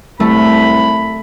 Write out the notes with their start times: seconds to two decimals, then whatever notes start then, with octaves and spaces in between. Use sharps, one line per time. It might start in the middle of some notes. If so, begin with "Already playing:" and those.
0.20 C2 A3 B5